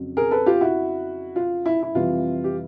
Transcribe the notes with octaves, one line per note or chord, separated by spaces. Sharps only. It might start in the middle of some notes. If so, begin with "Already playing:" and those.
Already playing: F2 C#3 F#3
G#4 A#4
A4 B4
F4 G4
E4 F#4
F4
E4
E4
F2 C3 E3 G3 F4
G4